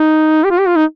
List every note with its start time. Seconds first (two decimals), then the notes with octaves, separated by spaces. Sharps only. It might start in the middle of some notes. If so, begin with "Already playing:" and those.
Already playing: D#4
0.44 G4
0.51 F4
0.59 G4
0.68 F4
0.76 D#4